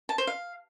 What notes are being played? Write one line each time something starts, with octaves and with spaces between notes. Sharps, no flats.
A5
C5
F5